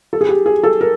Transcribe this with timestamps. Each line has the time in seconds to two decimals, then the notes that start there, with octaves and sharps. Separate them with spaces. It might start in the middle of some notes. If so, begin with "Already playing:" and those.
0.13 A4
0.21 G#4
0.29 G4
0.46 G#4
0.63 A4
0.81 A#4